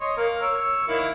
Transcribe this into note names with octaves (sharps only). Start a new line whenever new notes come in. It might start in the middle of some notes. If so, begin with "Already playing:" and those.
C#5 D#5 C6
A#3 A#4
C#5 E6
D#3 A#3 E4